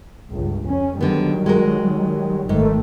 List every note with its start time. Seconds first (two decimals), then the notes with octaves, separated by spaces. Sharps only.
0.31 G1 C#2
0.65 F2 C#4
1.01 D3 D#3 F#3 G3 B3
1.46 G#3 F#4 A#4
2.49 G#1 G#2 D#3 A3